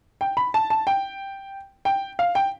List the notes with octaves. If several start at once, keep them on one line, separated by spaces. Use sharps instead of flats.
G5
B5
A5
A5
G5
G5
F5
G5